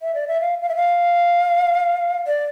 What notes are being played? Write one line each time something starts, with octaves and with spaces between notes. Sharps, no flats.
E5
D5
E5
F5
F5
E5
F5
D5